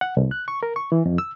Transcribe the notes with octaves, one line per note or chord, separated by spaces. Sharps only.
F#5
C2
F#6
C#6
A#4
C#6
E3
F2
E6